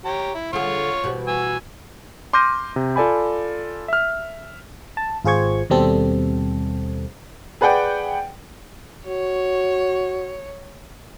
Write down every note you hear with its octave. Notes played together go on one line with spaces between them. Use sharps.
G4 C#5 A#5
E4
D3 F4 G#4 C#5 C#6
B2 E3 G3
G#5 E6
C6 D6 F6 G6 A#6 D#7
C3
F4 A4 D5 G#5 B5
E5 F6
A5
G#1 F4 G#4 C5 C#6 G#6
D#2 B2 G3 C4 A4
G#4 B4 D5 F#5 G5
F#4 C#5